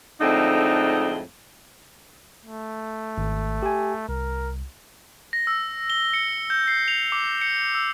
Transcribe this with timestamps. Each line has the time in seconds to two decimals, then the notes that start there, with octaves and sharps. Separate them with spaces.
0.21 F2 A2 D3 G#3 C4 D#4
2.45 A3
3.18 G#1
3.63 G4 G#5
4.09 C2 A#4
5.33 A#6
5.47 E6
5.90 G7
6.14 C#7
6.50 G6
6.68 C7
6.88 F7
7.12 D6
7.41 C#7
7.75 E6